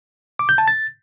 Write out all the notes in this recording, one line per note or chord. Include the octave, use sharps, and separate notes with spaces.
D6
G6
A5
A6